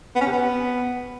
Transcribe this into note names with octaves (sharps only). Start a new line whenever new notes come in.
B3
C#4
C3
B3